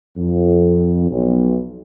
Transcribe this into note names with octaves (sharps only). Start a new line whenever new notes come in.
F2
B1